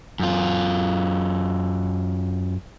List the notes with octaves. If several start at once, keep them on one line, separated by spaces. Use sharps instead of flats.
F#2 F4